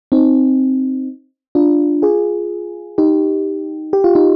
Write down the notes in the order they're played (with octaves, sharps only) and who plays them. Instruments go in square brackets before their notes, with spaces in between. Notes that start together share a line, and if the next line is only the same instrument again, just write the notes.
[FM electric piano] C4 D#4
D4 F4
F4 G#4
D#4 G4
G4
F4
D#4